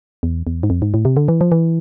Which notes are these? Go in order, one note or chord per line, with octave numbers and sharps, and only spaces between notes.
E2
E2
G#2
F2
G#2
A2
C3
D3
E3
F3
E3